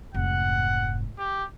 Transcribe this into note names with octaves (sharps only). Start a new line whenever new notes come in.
F1 G#2 F#5
G4